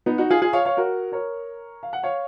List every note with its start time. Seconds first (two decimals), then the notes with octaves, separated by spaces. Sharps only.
0.06 B3 D#4
0.18 D#4 F#4
0.30 F4 G#4
0.42 F4 G#4
0.53 C#5 F5
0.65 C#5 F5
0.77 F#4 A#4
1.12 A#4 C#5
1.83 F5
1.93 F#5
2.03 C#5 F5